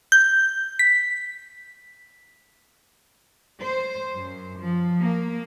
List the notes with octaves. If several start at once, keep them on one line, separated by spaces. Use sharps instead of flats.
G6
B6
C5
F#2
F3
A#3